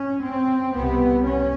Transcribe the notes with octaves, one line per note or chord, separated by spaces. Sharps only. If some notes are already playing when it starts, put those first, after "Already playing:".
Already playing: C#4
C4
C2 C3 B3
C#4